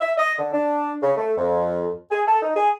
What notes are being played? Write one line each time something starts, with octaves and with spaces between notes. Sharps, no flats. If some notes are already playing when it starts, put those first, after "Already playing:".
E5
D#5
D3
D4
C#3
A3
F2
G#4
A4
D#4
G#4